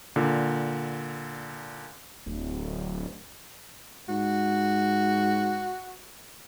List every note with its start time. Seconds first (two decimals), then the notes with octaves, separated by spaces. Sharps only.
0.16 A#2 D3
2.26 D1
4.08 G#2 F#4